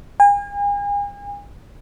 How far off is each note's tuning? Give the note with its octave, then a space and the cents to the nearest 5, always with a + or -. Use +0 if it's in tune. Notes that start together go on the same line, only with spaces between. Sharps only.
G#5 -40